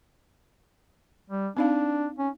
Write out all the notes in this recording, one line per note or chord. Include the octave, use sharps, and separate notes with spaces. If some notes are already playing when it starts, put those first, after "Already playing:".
G3
C4 D4 D#4 F5
C#4